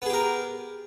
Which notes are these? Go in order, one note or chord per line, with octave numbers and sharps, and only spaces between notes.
B3 G4 G#4 A#4